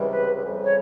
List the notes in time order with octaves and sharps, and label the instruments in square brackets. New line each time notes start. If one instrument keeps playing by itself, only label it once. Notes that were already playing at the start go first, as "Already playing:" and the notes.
Already playing: [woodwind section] C#2 C3 E3 G3
B4
F2 C#3 E3 G3
C#5